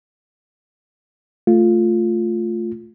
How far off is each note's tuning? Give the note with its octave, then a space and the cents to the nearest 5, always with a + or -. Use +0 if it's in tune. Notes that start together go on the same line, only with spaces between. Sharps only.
A3 +0 F4 +0